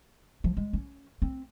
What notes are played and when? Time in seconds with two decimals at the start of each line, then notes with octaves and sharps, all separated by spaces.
0.44 F3
0.57 G#3
0.73 C#4
1.22 C4